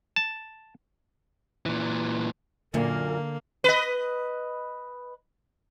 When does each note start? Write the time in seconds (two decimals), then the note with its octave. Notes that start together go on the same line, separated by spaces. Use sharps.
0.16 A5
1.66 A#2 E3
2.74 F#2 A#2 D3 A#3 A#4
3.64 B4 D#5